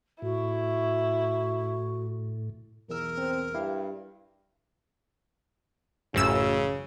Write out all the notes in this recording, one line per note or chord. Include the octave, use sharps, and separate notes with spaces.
A2 E4 F#4
B1 E2 A#4 E6
C4
G2 E4 G4 F5
A1 F#2 C#3 E6